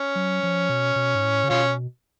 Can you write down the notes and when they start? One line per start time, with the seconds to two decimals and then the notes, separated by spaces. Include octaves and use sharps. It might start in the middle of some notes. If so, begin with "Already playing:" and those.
Already playing: C#4
0.15 F#3
0.43 F3
0.70 B2
0.96 B2
1.15 G#2
1.24 A2
1.44 C#3
1.50 B2 C#4 F4